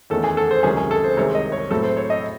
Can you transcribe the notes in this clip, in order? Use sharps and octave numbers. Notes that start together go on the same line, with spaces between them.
E2 D#3 A3 C#4 A4
G#4
A4
C5
C#2 C3 D#3 F#3 C#4 G#4
G#4
A4
C5
C2 C3 D#3 G#3 C4 C#5
D#5
C#5
A2 F#3 C4 A4
C5
C#5
D#5